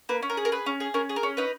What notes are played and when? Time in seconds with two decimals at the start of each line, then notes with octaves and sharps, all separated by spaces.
0.09 A#3 B4
0.22 C#4
0.30 A#4
0.37 G#4
0.45 A#4
0.52 G#4 B4
0.66 C#4
0.80 G#4
0.94 C#4 A#4
1.09 G#4
1.16 A#4
1.23 C#4
1.37 D#4 B4